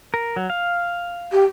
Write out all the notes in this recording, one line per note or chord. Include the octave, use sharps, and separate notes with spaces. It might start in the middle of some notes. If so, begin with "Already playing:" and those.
A#4
F#3
F5
G4